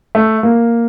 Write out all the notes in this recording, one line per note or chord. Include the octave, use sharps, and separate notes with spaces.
A3
A#3